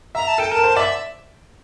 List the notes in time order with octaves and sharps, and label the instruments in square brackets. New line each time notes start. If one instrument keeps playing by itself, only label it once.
[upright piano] E5 [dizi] A#5
[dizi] A5
[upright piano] A4 [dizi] G5
[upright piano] A#4 [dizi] A5
[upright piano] C5
[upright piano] D5 [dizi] E5